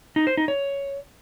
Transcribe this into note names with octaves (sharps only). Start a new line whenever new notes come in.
D#4
C5
D#4
C#5